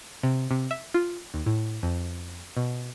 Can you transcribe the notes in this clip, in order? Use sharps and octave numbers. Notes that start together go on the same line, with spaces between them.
C3
C3
E5
F4
D#2
A2
F2
B2